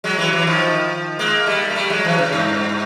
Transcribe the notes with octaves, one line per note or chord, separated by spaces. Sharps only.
F#3 G#3
E3 F#3
E3 F#3
D#3 F3
G#3 A#3
G3 A3
A#3
G3 A3
F#3 G#3
E3 F#3
C#3
G2